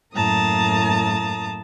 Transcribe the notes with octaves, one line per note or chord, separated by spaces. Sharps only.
F#2 A2 A#3 A5 A#5 D#6